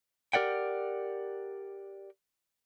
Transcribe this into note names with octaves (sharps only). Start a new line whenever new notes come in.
G4 A#4 D5 F#5 G5